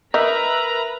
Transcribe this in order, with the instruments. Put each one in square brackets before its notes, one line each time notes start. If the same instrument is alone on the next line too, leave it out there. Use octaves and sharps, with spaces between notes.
[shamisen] D#4 [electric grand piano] A#4 E5 [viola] B4 B5 [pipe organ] A#5